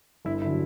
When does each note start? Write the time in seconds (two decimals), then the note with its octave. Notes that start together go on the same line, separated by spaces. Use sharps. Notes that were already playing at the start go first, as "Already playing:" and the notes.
0.25 G1 E4
0.42 D3 F#3 E4